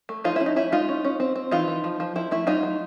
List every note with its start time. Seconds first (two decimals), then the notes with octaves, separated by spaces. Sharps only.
0.09 A3
0.24 F3 D#4 F4
0.36 C#4 E4
0.46 D#4
0.56 C#4 E4
0.72 G#3 D#4 F4
0.89 C#4
1.05 C#4
1.20 C4
1.36 C4
1.51 E3 D#4 F4
1.68 E3
1.84 F3
2.00 F3
2.16 F3 E4
2.31 A3 E4
2.47 F#3 D#4 F4
2.63 F#3